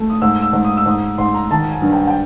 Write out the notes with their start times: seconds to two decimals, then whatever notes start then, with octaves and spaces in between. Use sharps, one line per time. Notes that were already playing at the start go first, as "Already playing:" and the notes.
Already playing: A3
0.10 D#6
0.22 G#2 E6
0.42 E6
0.53 G#2
0.64 D#6
0.77 E6
0.86 G#2 D#6
1.18 G#2 C6
1.34 A#5
1.51 D#3 A5
1.72 G#5
1.82 G2
1.93 G5
2.07 G5